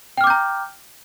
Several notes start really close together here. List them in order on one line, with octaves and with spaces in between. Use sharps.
G5 F6 D6 G6 A#5